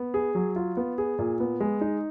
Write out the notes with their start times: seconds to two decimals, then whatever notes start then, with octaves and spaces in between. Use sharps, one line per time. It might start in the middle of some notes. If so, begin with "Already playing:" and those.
Already playing: B3
0.14 G#4
0.35 F#3
0.56 F4
0.77 B3
0.98 G#4
1.19 A#2
1.40 B3
1.60 G#3
1.81 D#4